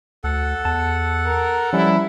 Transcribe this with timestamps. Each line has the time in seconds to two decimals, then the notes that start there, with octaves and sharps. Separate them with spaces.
0.24 D2 A4 F#5
0.65 E2 A5
1.26 A#4
1.73 F3 G3 C#4 E4